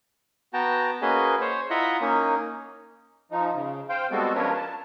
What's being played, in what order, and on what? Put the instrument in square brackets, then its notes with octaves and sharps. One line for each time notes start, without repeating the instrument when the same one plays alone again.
[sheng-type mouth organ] B3 F#4 G5 A5 A#5
A#3 C#4 F#4 G#4 B4 D#5
C5 C#5
E4 F4 D#5 E5 F#5 A#5
A#3 C#4 D#4
[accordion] F3 D#4
C#3
C5 F5 G5
G3 G#3 B3 C4 F#4 A4
F3 C#4 D4 A#4 B4 C#5
A5